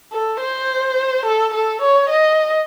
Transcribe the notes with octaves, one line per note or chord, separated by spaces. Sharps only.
A4
C5
A4
A4
C#5
D#5